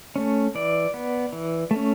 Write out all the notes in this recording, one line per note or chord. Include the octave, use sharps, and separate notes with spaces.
A3 C#4
E3 D5
B3
E3
A3 C#4